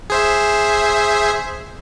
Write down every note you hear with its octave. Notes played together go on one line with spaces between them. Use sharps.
G#4 C5 E5